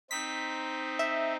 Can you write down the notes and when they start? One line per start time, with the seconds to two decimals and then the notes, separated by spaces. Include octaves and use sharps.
0.11 C4 D#4 B6
0.99 E5